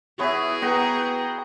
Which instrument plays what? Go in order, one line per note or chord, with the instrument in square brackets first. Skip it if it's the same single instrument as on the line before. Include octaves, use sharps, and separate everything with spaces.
[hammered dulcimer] E3 B3 F#4 [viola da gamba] E4 G#4 [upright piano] C#5 E5
[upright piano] B3 [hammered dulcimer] F#4 [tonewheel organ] G5 A#5